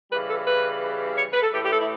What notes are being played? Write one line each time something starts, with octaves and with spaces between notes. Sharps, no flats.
C#3 E3 G3 B4
A4
B4
C#5
B4
A4
A2 E3 A3 G4
G4
A4
E4